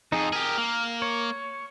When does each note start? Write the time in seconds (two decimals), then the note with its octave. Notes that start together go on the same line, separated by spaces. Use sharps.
0.12 F2 D#4 G#4
0.33 G4 G#4 A#4
0.58 A#3
1.02 C#5